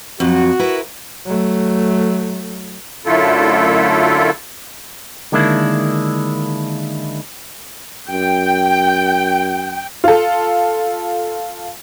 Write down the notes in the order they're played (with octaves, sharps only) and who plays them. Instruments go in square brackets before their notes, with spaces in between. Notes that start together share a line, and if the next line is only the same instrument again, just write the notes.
[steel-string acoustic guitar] F2 F#3 [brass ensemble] F#4
[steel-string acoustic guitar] E4 A#4 B4
[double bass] F#3 A3
[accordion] F#2 D3 A3 E4 F4 A4
[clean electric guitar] D3 D#3 G#3 A#3 D4 E4
[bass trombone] F#2 [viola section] G5
[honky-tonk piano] F4 A4